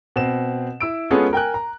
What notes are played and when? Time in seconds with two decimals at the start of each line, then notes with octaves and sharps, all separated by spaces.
0.16 B2 C4 E7
0.81 E4 E6 D7
1.10 G#3 B3 C#4 F4 G#4 A4
1.33 A#4 G5 G#5 F#6
1.54 A#5